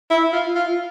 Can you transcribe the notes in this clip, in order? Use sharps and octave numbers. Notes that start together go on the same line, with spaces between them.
E4
F4
F4